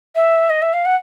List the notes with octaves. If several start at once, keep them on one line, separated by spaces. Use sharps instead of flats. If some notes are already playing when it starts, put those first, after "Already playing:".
E5
D#5
E5
F5
F#5